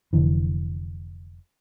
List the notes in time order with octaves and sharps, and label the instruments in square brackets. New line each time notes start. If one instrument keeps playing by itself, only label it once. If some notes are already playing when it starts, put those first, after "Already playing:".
[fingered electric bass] F1 D3 E3